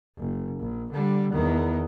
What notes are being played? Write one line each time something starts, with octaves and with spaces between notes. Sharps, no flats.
F#1
A#1
D3 G3
E2 D#3